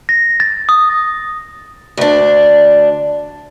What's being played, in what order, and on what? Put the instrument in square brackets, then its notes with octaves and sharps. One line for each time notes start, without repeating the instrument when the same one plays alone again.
[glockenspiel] A#6
A6
D#6
[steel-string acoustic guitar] D2 D4